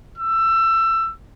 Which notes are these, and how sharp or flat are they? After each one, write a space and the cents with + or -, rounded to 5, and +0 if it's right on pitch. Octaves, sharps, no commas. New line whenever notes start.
E6 +20